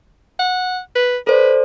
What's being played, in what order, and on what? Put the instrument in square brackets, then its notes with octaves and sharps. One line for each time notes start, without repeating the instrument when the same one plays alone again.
[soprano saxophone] F#5
B4
[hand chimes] A4 C5 D5 [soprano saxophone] B4